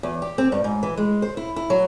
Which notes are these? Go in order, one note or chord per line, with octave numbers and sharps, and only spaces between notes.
E2
G4
C4
G2
G#2
E3
G#3
C5
E4
E4
F#3